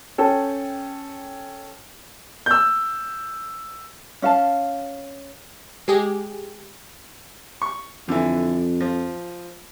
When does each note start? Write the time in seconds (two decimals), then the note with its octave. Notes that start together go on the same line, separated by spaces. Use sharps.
0.18 C#4 A4 G5 A5
2.46 E6 G6
4.22 C#4 F5 A5
5.88 G#3 G4 G#4
7.62 C#6
8.08 F2 D3 E3
8.80 F3